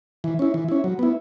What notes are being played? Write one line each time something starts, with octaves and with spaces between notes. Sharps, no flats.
E3
C#4 E4
E3
C#4 E4
F#3
B3 E4